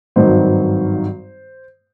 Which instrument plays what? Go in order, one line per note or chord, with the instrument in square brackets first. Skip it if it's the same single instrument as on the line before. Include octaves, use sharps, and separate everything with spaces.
[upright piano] G#1 G2 D#3 F#3 C5